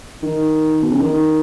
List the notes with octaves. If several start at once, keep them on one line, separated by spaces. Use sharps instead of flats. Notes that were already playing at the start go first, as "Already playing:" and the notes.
D#3
B2
C#3
D#3